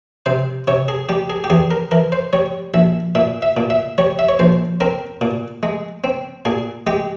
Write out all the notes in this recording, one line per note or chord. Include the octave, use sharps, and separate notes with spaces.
C3 C5
C3 C#5
G#4
G3 G4
G#4
G4
E2 G#4
A#4
E3 A#4
C5
G3 C#5
A#1 E5
A#2 E5
E5
A#2
E5
G3 C#5
E5
C#5
A#1 C5
C4 A#4
A#2
G#3
C4
A#2 G#4
G#3 G4